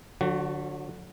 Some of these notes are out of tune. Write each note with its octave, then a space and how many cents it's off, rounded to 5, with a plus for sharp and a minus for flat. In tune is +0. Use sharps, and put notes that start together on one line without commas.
D3 +0 F#3 -40 F#4 +25